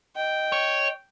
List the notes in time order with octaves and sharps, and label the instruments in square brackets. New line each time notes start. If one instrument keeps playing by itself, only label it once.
[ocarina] D#5 [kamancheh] G5
[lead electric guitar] C#5